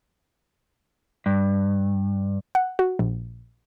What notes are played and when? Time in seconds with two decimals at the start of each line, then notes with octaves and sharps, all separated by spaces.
1.26 G2
2.55 F#5
2.79 F#4
2.99 A#1